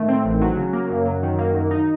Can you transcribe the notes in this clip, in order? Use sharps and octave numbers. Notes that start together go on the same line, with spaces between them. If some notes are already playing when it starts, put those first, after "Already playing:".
Already playing: A2 D#3 A3
C4
A1
F#3
C#3
A#3
F#2
F#3
D#3
A#3
F#2
D#4